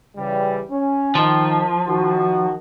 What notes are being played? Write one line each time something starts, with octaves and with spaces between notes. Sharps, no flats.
C#3 E3 G3
C#4
D#3 F3
D#3 F#4